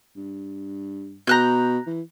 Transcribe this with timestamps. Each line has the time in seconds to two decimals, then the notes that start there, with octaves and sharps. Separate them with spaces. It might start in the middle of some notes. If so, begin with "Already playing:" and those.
0.16 G2
1.27 B2 A#5 F#6 G6
1.87 E3